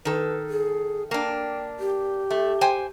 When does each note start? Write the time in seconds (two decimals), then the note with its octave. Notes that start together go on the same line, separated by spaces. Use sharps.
0.05 D#3 A4 B4
0.50 G#4
1.11 A#3 D4 G5
1.80 G4
2.30 A3
2.61 C5 G5 G#5